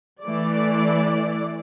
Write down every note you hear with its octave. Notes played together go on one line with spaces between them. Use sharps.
E3 A3 D5